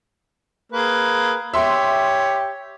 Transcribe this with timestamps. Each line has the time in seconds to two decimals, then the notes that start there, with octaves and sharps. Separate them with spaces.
0.72 A#3 G#4 B4
1.54 G4 C#5 E5 C6